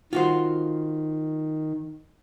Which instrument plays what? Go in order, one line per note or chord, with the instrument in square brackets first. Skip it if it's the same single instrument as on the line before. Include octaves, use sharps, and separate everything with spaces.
[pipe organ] D#3 [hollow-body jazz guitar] F4 F#4 C5